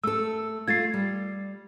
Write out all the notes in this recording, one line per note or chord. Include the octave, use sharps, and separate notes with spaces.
A3 A4 E6
A3 F4 G#6 A6 C7
G3